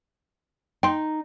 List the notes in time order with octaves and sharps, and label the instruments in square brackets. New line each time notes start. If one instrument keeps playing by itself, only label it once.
[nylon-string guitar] D#4 [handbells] G5 C6